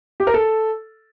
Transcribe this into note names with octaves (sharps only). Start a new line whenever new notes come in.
G4
A#4
A4